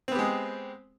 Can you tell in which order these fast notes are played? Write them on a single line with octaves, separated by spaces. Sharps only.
C4 B3 G4 G#3